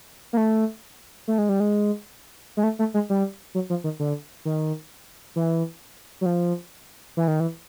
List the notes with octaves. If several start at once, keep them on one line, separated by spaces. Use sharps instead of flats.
A#3
A3
A3
G#3
G3
G#3
G#3
A3
A3
G#3
G3
F#3
F3
D#3
D3
D#3
E3
F#3
F3
E3
D#3
E3